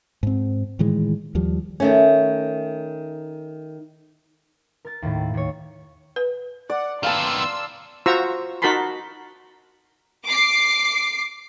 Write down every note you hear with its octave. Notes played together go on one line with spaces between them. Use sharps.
G#2 C4
A2 D#3 E3 G#3
D#2 F3 G3
D#3 A3 C#4
A#4 A6
D#2 A2
D#2 C#5
B4
D5 F#5
D#3 B3 F5 A5 C6 E6
F4 F#4 C5 A#5 C#6 E6
D#4 F#4 A#4 A5 B5 C6
D6 C7